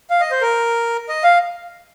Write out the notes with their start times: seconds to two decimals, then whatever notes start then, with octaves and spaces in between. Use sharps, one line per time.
0.10 F5
0.20 D#5
0.31 C5
0.41 A#4
1.09 D#5
1.23 F5